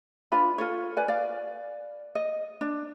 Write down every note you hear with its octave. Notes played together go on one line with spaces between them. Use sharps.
D4 F4 B4 B5
F4 A4 C#5
B4 D5 G#5
D5 F5
D#5
D4